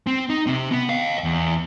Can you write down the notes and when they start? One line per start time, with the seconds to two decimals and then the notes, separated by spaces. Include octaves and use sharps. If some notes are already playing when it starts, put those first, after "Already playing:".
0.07 C4
0.30 D#4
0.47 C3 C4
0.71 B3
0.89 D#5 F5
1.24 E2